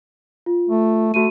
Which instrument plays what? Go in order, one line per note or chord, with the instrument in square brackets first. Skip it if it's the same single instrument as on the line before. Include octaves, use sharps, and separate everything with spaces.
[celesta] F4
[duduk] A3
[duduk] A3 [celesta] F#4 D#7